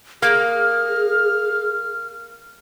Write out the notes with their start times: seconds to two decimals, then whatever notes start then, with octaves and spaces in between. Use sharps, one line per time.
0.22 A#3 G#4 F6